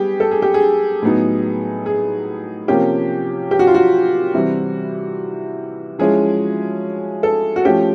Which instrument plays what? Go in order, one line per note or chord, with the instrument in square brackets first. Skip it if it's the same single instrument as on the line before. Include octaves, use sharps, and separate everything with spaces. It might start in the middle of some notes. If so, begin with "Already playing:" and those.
Already playing: [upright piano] G3 B3 G4 G#4
A4
G#4
G4
G#4
A2 F#3 B3 D#4
G#4
C3 F3 A#3 C#4 G4
G4
F#4
F4
F#4
C3 E3 G3 C4 E4
F3 G#3 C#4 E4 G#4
A4
F#4
F3 A3 C#4 G4